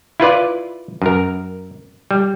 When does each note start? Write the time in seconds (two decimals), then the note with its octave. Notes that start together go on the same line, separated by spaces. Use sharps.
0.20 E4 F4 B4 D5
1.02 F#2 A#4
2.11 G3